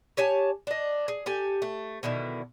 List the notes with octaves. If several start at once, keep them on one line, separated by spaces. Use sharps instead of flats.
G4 C#5 G#5 A5
D4 D#5
G#4
G4 A4 G#5
A3
B2 D3 D#3 E4